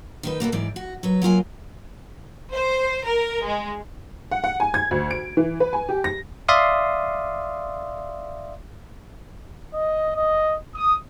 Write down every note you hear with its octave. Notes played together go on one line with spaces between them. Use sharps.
D#3 D#4 B4
B2 A#3 F#4 A4
G#2 E3 D5
F#4
F#3 B4
F#3 A#3 F4 G#5
C5
A#4
G#3
F#5
F#5
G#5
G#6
D2
D7
E3
B4
G#5
G4
A#6
D5 E5 F5 C6 D#6
D#5
D#5
D#6